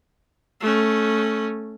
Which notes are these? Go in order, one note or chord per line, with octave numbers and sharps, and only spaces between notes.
A3 C#4